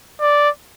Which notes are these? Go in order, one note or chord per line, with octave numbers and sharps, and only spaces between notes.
D5